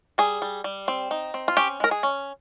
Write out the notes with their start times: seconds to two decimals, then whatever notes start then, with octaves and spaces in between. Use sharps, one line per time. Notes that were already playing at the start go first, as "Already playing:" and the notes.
0.18 G3 G#4
0.42 G3
0.64 G3
0.88 C4
1.11 D#4
1.34 C4
1.48 F4
1.57 C#4 G4
1.80 G#3 A#4
1.91 G#4
2.03 C#4